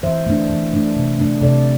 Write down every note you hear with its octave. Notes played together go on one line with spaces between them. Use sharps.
E3 C5 E5
A3 D4
E3
A3 D4
C3
A3 D4
C3 A4 D5